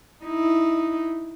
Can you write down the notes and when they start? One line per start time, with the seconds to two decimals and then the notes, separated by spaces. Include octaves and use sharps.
0.25 D#4 E4